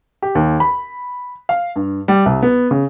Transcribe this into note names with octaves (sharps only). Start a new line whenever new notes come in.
G4
D#2
B5
F5
G2
G3
C2
B3
C#3